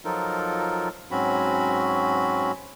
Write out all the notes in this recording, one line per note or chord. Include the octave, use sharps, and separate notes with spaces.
F3 F#3 D#4 F4 A4 A#4
G#2 F#3 C4 C#4 F#4 B5